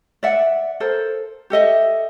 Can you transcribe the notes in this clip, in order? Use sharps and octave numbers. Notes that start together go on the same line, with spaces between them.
D5 E5 F#5
A4 A#4 C5
G4 A4 D#5 E5